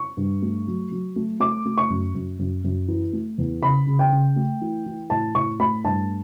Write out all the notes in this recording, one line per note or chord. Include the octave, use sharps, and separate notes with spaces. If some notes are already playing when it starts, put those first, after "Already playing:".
Already playing: C#6
G2
A3
F#3
F#3
A3
A3 D6
A3
C#6
F#2
F#2
F#2
F#2
E3
A3
E2
C#3 B5
C#3
G5
C#3
A3
E3
E3
A2 A5
A2 C#6
A3 B5
G2 A5